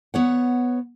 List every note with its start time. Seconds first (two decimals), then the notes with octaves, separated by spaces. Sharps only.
0.14 B3 C#5 F#5